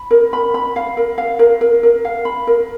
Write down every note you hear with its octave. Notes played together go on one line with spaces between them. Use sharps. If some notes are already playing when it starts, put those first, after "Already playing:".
Already playing: B5
A#4
B5
B5
F5
A#4
F5
A#4
A#4
A#4
F5
B5
A#4